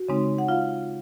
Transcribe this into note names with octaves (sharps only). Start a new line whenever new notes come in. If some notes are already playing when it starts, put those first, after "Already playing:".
Already playing: F#4
C#3 G#3 C4 D#4
F#5
F4 F5